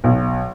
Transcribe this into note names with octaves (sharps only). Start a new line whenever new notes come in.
B1